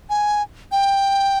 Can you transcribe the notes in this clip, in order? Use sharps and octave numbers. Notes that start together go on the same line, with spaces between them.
G#5
G5